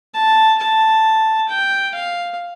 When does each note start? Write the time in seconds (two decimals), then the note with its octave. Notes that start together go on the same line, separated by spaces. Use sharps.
0.14 A5
0.58 A5
1.49 G5
1.95 F5